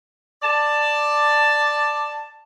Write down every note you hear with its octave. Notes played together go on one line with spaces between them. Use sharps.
D5 A5